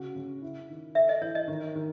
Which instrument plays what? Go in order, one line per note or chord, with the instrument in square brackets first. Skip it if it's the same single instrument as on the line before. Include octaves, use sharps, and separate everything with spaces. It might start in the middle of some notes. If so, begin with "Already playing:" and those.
Already playing: [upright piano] C#3 F#4
C#3
E4
D#3
[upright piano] A4 [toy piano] E5
[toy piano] D#5
[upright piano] E3 [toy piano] C#5
[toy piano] D#5
[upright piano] D#3
D#3